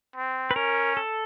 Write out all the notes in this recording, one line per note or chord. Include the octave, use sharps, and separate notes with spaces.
C4
B4
C#4 A#4
A4